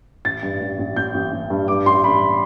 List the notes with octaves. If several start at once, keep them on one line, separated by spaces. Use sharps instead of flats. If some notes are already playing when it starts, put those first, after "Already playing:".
A1 A6
G2
A1
A1
A1 G6
A1
A1
G2
G2 D6
A1 C6
G2 B5